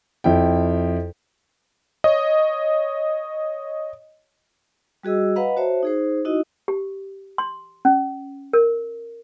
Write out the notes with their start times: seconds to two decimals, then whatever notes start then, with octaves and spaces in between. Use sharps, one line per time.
0.24 F2 E4 G5
2.04 C#5 D#5
5.03 G3 F#4 G#4 D#5 E6
5.36 B4 D#5 F5 F#5 A#5 B5
5.57 F#4 C5 C#5 E5 A5
5.83 D#4 G#4 C5
6.25 D#4 E4 F#4 D#5
6.68 G4
7.38 C6
7.85 C#4
8.53 A#4